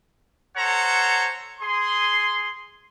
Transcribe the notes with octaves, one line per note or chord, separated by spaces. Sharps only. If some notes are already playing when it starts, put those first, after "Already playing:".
A4 C5 C#5 F#5 A#5
G#4 C6